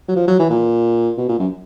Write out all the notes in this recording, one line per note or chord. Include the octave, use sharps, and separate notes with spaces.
F#3
F3
F#3
E3
A#2
B2
A#2
F#2